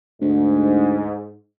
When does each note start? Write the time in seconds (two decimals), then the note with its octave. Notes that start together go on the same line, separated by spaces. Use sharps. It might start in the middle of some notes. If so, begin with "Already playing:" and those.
0.21 D2 G#2